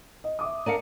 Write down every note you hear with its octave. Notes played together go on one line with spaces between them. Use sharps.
D#5
E5 D6 D#6
D4 A#4 F5 C#7 D#7